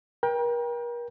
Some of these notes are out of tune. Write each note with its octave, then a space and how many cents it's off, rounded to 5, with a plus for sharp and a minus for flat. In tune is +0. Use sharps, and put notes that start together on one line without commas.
A#4 +40 G5 +15